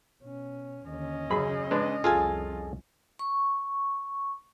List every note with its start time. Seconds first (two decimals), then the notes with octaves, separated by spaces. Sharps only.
0.23 B2 C#4
0.86 D#2 D3 C#4 D#5
1.30 F#2 C#3 G#4 B5
1.71 G#3 D4 B4
2.04 C2 F2 F4 G#4 A4 G#5
3.19 C#6